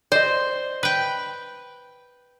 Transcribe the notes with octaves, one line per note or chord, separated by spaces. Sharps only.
C5 D5 D#5
B4 G5